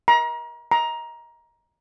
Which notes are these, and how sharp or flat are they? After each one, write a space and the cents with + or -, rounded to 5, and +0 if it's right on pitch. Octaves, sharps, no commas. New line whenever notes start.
A#5 +30
A#5 +15